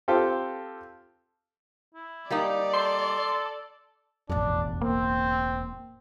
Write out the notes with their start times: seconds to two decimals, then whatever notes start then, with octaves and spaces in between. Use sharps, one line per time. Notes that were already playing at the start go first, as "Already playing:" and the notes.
0.08 C4 F4 G4 A4
1.94 E4
2.30 G3 A#3 D#4 D5
2.74 A4 C6
4.30 E1 A1 F2 D4
4.81 A#3 C4